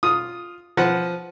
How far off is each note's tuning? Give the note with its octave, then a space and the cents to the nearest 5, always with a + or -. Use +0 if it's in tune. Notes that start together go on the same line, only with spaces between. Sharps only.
F4 +0 D#6 +0
F3 +0 B4 +15 F#5 -5